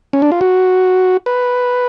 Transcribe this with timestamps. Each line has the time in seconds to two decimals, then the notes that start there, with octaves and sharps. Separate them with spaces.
0.13 C#4
0.22 D4
0.32 F4
0.41 F#4
1.26 B4